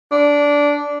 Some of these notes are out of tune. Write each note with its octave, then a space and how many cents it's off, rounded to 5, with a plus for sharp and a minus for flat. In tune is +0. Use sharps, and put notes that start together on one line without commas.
D4 -15